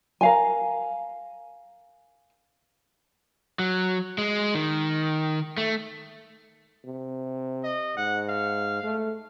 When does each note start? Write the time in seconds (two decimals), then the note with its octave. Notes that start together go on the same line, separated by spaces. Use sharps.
0.21 A#4 F5 G#5
3.59 F#3
4.18 G#3
4.55 D#3
5.57 A3
6.85 C3
7.64 D#5
7.97 G#2 F#5
8.29 F5
8.83 A3